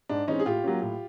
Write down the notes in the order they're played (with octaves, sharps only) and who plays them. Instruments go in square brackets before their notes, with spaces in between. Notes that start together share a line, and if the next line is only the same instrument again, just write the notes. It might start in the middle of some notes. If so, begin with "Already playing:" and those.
[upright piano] G#2 D4
E3 G#3 C4 C#4 D#4
G#4
A2 F4 G4
F#3 A#3 C#4
A2